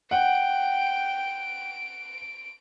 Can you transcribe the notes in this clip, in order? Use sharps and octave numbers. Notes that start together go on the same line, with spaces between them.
F#5 G5 D7